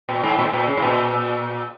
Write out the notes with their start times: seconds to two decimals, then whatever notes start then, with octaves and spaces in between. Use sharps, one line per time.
0.09 A#2
0.23 G#2
0.38 A#2
0.45 G#2
0.53 A#2
0.67 C#3
0.77 G#2
0.82 A#2